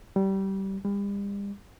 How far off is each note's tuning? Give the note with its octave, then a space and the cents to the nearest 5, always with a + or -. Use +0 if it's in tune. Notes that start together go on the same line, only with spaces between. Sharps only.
G3 -20
G3 +40